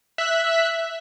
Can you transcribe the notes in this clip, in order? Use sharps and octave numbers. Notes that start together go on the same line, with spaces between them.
E5 F#6 B6